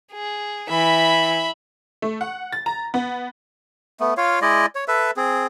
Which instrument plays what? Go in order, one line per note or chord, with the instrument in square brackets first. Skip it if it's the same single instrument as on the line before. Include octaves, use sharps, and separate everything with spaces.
[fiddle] G#4
[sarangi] E3 [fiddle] E5 B5
[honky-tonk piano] A3
F#5
A6
A#5
B3
[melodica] A3 B3
F4 C#5 F5
G#3 E4 D5 D#5
C#5
A4 B4 E5
C4 G#4